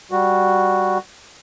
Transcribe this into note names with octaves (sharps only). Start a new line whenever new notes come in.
G3 F#4